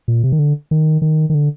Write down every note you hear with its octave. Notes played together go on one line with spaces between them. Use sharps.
A#2
C3
D#3
D3
D#3
D#3
D#3
D3